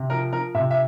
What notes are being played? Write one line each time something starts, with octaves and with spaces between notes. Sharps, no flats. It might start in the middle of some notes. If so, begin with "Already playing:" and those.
Already playing: C3
F3 A#4
F3 A#4
C3 E5
E5